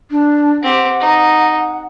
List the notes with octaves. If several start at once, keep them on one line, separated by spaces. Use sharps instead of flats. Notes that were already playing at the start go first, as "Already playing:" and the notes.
D4
C4 G4 F#5
D#4